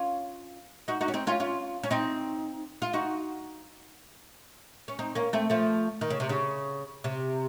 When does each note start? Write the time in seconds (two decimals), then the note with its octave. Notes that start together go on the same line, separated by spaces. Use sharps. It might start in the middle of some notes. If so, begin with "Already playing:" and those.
Already playing: C#4 F4
0.88 D#4 F#4
1.01 D#4 F#4
1.08 C#4
1.14 C4 D#4
1.27 C#4 F4
1.40 C#4 F4
1.83 C#4
1.91 C4 D#4
2.82 F4
2.93 D#4 F#4
4.88 C#4
4.99 C4 D#4
5.15 A#3 C#4
5.33 A3 C4
5.50 F3 A3
6.01 D#3
6.10 C#3
6.20 C3
6.29 C#3
7.04 C3